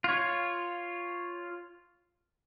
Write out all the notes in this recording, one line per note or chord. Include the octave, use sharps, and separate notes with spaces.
F4 C#5